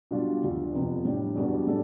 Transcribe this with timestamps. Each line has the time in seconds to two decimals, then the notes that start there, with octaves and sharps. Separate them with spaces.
0.11 B2 G3 D4 F4
0.42 D2 D3 F3
0.73 F2 C3 F3 B3
1.05 A2 G3 D4 G4
1.35 E2 B2 G3 B3 D4
1.67 A2 G3 D4 A4